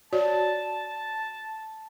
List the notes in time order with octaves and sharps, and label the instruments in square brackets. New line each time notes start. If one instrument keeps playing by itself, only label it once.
[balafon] F#4 C#5 D5 [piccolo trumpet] A5